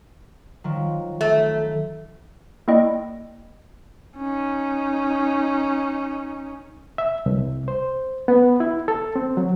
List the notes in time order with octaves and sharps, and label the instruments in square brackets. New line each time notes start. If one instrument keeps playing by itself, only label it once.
[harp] D#3 F3 F#3
[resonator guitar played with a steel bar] A3
[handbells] A#3 E4 D5 D#5 G5 A#6
[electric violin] C#4 D#4
[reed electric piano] E5
C2
C5
B3
E4
A4
C4
F#3